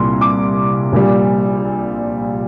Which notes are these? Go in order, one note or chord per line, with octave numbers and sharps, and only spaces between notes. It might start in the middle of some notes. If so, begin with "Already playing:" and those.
Already playing: C2 A#2 G3 C6
D6
A#1 A#2 G3